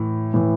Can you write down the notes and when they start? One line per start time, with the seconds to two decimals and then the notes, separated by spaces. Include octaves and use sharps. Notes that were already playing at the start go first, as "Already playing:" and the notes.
Already playing: A2 E3
0.34 A2 E3